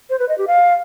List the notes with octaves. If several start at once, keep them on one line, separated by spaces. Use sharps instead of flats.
C5
B4
D#5
G4
F5